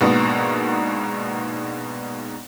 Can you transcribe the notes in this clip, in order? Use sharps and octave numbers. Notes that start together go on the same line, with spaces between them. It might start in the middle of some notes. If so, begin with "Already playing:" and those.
A#1 G#2 B2 A#3 B3 A#5